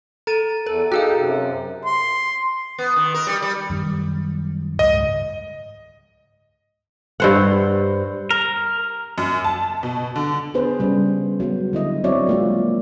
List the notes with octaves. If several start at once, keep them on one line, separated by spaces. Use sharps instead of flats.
A4 A#5 A6 D#7
E2 A4 A#4
D#4 F#4 G#4 A4 F5 G5 F#6
F#2 C3
C6
B3
D#3
A#4
G3
G3
F#2 D#3 G3
C#2 G#2 D#5
G2 C5 F#5
A#4
F#2
A5
B2
D3
B3 D4 G#4 B4 C5
C#3 G3
F#3 B3
D3 E4 D#5
F#3 C4 C#5 D5 E5
G#3 A#3 F4